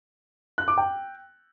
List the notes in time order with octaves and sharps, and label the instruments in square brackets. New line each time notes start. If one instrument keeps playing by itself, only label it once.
[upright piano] F#6
D6
G5